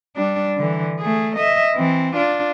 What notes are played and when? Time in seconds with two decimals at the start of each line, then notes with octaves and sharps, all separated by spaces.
0.16 G3 D4
0.57 D3 E3
1.00 A3 G#4
1.36 D#5 E5
1.75 E3 C4
2.17 D4 F4